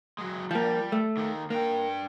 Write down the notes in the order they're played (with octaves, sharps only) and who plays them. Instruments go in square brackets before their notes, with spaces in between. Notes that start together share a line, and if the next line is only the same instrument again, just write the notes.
[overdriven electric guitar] F#3 G#3
[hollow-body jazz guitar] F3 A#3 [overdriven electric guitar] G3
[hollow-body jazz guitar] A3
[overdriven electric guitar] D#3 A#3
[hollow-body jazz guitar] A#3 [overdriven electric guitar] D4 G5